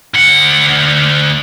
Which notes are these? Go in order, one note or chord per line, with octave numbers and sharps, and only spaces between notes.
D2 F#5